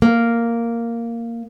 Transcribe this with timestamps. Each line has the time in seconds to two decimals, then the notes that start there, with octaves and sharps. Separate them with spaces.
0.02 A#3